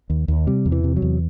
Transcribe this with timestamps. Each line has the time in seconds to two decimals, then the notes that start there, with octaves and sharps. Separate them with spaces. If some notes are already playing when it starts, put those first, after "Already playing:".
0.10 D#2
0.28 D#2
0.47 C3 G3
0.66 E2
0.72 E3
0.84 C3
0.97 F#3
1.02 E2